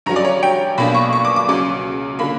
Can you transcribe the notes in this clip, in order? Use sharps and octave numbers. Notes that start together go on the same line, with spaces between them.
G2 F#3 C#4 A#5
D5
C#5
G5
B1 B2 A#3 D4 B5
C#6
C#6
D6
D6
C#2 C#3 F#3 D6
D3 A#3 B5